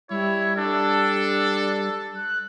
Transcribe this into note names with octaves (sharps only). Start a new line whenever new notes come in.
G3 E4 C#5
D4 A4
F#6